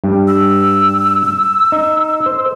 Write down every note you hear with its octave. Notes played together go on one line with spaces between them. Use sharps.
G2 G3
E6
D#4
C5